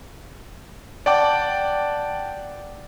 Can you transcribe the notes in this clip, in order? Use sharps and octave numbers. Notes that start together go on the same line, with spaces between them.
D5 F#5 G5 A5 D6